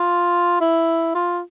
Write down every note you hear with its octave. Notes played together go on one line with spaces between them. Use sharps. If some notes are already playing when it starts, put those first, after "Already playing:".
Already playing: F4
E4
F4